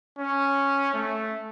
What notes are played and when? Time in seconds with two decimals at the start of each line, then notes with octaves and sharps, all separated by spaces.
0.19 C#4
0.94 A3